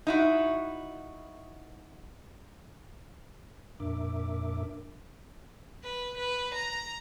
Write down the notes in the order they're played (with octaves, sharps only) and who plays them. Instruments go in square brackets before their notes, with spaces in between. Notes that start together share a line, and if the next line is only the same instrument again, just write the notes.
[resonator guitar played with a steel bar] D#4 E4 F#4
[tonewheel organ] F2 A#2 D4 A#4 E5 D6
[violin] B4
B4
A#5